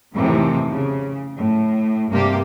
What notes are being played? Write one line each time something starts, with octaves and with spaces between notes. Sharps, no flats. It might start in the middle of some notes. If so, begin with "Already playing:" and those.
F2 A2 C3 D#3 E3
C#3
A2
G2 C3 A#3 G4